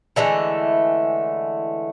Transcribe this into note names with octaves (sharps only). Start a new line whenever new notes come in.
D3 E3 G#3 A3